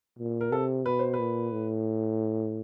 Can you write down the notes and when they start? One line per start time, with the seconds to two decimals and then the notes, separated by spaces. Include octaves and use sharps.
0.19 A#2
0.41 A#4
0.52 C3 A4
0.86 B2 B4
0.99 C5
1.14 B4
1.19 A#2
1.52 A2